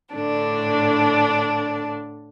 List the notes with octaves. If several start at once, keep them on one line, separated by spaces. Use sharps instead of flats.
A2 D3 D4 A5